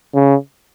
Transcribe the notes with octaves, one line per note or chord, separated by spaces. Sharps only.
C#3